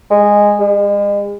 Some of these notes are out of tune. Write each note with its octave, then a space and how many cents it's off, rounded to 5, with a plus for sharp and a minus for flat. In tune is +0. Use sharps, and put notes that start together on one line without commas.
G#3 -10
G#3 -40